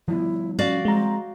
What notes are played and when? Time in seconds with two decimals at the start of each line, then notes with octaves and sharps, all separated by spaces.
0.08 F3 G3 B3 E4
0.59 C#4 F#4 D5 F5
0.85 G#3 C4 A#5